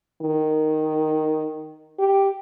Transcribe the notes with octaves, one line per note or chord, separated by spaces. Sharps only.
D#3
G4